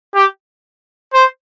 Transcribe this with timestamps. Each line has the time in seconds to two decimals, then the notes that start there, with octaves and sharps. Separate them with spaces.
0.15 G4
1.14 C5